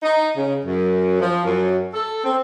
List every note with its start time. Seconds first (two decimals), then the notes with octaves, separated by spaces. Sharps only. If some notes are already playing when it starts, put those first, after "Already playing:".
0.03 D#4
0.36 C#3
0.65 F#2
1.20 F3
1.44 F#2
1.94 A4
2.24 C4